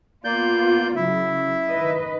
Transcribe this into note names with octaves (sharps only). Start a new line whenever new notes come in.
A#3 B3 F4 D5 G6
C#3 F#3 E4 E5
D#3 B4 D#5